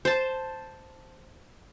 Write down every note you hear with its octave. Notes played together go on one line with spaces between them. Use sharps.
C5 A5